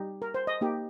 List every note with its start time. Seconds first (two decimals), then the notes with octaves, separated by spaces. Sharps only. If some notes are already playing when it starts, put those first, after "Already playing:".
Already playing: G3 D#4 G4
0.22 A#4
0.34 C5
0.47 D#5
0.61 A#3 D#4 G4